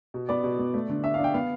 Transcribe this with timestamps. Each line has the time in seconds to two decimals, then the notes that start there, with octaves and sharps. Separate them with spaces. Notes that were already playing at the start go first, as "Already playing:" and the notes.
0.14 B2
0.29 B3 D5
0.44 B2
0.59 B3
0.74 A3
0.89 D3
1.04 D4 E5
1.14 F5
1.19 D4
1.24 G5
1.34 B3 F5